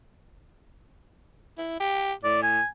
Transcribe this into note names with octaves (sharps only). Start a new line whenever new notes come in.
E4
G4
A2 D5
G#5